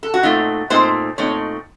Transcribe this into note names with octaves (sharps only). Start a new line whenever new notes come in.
A4
F#4
A#2 A3 C4 D#4 F4
A#2 A3 C4 D#4 C5
A#2 A3 C4 D#4 C#5